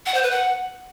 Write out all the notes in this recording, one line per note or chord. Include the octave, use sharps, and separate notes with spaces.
F#5
C5
B4
F#5